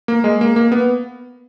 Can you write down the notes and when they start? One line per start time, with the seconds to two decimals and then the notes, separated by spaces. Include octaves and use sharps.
0.08 A#3
0.24 G#3
0.41 A#3
0.56 A#3
0.72 B3